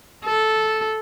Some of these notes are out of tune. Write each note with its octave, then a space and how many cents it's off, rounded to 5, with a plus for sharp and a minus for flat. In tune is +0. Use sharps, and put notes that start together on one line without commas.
A4 -10